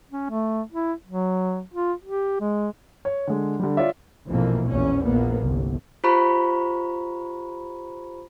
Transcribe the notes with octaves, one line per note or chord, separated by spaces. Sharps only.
C#4
A3
E4
F#3
F4
G4
G#3
C#5
D3 G#3
D3 G3
F4 C#5 D5 E5
A#1 F2 B2 E3 A#3
A#1 E2 C#4
A#1 A#3 B3
G1 C2
F4 G4 C5 A#5 B5 C#6